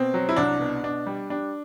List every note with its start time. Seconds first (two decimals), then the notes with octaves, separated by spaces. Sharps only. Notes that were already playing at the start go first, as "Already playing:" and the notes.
Already playing: B2 C4
0.14 F#3
0.29 E4
0.36 C2 D4
0.60 B2
0.83 B2 D4
1.07 G3
1.30 G3 D4